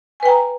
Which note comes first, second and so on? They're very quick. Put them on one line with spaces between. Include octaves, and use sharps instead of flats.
G#5 B4 G5 A#5